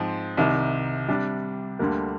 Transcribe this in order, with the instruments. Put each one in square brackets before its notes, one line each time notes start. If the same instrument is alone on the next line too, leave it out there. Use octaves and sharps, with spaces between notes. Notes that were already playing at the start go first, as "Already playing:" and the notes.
Already playing: [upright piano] G#2 F3 C4
C2 C3 D#3
C3 G3 D4 G4
D2 D3 G3 A#3